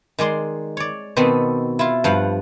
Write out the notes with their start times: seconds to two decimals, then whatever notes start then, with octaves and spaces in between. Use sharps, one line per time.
0.19 D#3 G#3 D5 C6
0.77 C#5 D5
1.16 B2 D#3 B3 C4 A4
1.79 E4 F4
2.04 G2 F3 F5 F#5